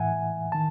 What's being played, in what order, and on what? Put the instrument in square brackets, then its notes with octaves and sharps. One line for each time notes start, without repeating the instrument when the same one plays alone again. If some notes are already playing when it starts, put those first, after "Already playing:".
Already playing: [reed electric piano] A2 E3 E5 F#5 G#5
D#3 A5